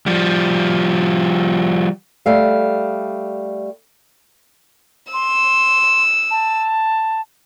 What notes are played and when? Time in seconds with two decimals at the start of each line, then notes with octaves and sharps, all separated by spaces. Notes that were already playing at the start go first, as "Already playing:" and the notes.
0.06 F3 G3
2.26 G3 A3 F5
5.13 C6 E6
6.31 A5